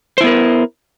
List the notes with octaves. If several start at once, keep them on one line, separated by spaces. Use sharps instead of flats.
B3 E4 A#4 C5